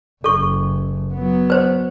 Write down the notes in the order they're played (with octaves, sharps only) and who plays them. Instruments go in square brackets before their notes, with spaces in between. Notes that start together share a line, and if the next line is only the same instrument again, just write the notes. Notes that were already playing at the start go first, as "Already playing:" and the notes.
[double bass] F#1 [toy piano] A4 C#6
[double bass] F#3 B3
[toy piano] B4 C5